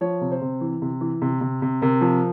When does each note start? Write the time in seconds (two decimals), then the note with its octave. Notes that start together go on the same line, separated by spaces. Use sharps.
0.01 F3 C#5
0.21 C3
0.32 C5
0.42 C3
0.61 E3
0.82 C3
1.01 E3
1.22 C3
1.41 C3
1.62 C3
1.82 C3 A#4
2.01 F3